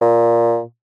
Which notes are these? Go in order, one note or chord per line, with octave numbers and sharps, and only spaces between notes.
A#2